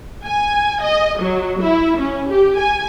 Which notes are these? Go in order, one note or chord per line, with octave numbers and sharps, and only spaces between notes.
G#5
D#5
F#3
E4
C#4
G4
G#5